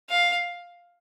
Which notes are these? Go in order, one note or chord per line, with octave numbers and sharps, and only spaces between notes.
F5